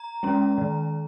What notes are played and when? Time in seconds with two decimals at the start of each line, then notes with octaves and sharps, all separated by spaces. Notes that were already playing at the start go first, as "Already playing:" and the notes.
Already playing: A#5
0.23 G#3 C#4
0.58 D#3